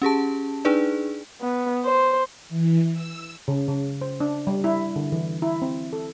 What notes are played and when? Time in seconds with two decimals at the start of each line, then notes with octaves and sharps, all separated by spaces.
0.02 C#4 G4 G#4 A5
0.65 D4 D#4 G#4 B4 D5
1.41 B3
1.85 C5
2.49 E3
2.93 E6
3.48 C#3
3.68 C#3
4.01 C5
4.20 D4
4.47 G3
4.64 E4
4.96 D3
5.12 E3
5.42 E4
5.62 C4
5.93 A4